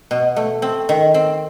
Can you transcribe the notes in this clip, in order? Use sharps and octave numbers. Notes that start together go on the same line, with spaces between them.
B2
A3
C4
D#3
C4